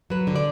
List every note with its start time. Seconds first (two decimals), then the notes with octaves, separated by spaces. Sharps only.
0.10 F#3 B4
0.27 D3
0.36 D5